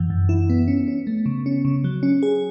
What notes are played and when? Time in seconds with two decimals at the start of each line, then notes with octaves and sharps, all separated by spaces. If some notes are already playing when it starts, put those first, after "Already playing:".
Already playing: F#2 E3
0.10 F#2
0.29 E4
0.50 B3
0.68 C#4
0.88 C#4
1.07 A3
1.26 C#3
1.46 C#4
1.65 C#3
1.84 F#3
2.03 C#4
2.23 G#4